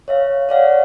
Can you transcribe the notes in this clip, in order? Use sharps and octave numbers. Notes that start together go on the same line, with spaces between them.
C#5 E5 F5
C#5 D5 F5 F#5